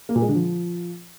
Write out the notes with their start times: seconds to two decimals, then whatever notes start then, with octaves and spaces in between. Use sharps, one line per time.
0.09 A#3
0.16 A#2
0.22 G#3
0.29 D3
0.35 F3